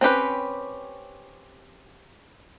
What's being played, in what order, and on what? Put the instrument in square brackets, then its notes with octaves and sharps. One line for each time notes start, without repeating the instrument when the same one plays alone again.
[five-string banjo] C4 C#4 G4 B4